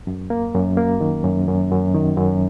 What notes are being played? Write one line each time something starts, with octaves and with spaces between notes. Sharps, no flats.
F#2
A#3
F#2
A#3
D#3
F#2
F#2
F#2
D#3
F#2